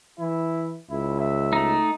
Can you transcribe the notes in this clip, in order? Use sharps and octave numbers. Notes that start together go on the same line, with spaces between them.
E3 E4
C#2 E4
E5
A3 D#4